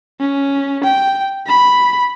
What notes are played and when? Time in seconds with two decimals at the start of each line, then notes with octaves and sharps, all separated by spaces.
0.20 C#4
0.84 G5
1.47 B5